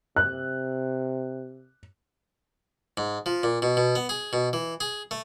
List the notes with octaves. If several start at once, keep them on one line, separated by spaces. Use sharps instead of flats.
C3 F#6
G#2
F3
A#2
B2
B2
B3
G#4
B2
E3
G#4
A3